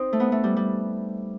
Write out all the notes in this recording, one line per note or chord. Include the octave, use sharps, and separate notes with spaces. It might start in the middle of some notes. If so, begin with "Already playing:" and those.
Already playing: C4 D#4
A3
B3
A3
G3
G3